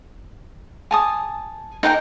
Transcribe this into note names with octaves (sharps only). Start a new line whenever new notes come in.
G#5 A5 D#6
D#4 A#4 G5 A#5